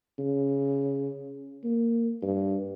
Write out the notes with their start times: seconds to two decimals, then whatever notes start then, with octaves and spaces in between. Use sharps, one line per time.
0.19 C#3
1.64 A#3
2.22 G2